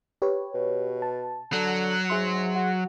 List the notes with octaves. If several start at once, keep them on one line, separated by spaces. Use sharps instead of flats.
G4 B4 C#5
B2
A5
D3 F#3
G#2 G#4 E5 C6
F#4